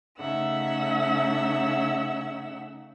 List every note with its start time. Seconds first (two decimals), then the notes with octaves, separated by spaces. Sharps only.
0.20 C#3 A3 D#4 E5 F#5 E6